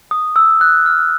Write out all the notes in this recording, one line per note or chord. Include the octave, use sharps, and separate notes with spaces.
D#6
E6
F#6
F6